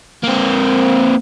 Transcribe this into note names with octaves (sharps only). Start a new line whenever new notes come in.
A#3 C4